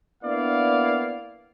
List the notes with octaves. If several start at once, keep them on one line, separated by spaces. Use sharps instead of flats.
A#3 B3 D4 E4 D5 F5